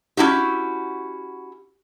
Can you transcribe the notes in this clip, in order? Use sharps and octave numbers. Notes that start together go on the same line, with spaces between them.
C#4 D#4 E4 F#4 G4